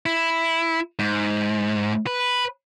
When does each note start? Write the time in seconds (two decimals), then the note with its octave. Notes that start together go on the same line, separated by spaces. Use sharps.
0.06 E4
0.99 G#2
2.07 B4